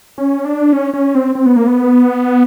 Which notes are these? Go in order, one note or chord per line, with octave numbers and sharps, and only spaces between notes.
C#4
D4
C#4
C#4
C4
C4
B3
A#3
B3